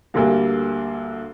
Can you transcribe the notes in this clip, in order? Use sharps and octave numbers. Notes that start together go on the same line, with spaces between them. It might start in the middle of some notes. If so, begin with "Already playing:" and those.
D2 D3 G3 A#3